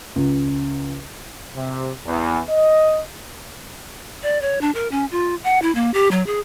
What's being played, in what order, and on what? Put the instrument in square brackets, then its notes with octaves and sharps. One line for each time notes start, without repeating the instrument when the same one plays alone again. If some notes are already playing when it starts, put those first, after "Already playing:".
[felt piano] C#2
[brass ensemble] C3
E2
D#5
[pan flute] D5
C#5
D4
A#4
C#4
F4
F#5
E4
A#3
G4
F#3
G#4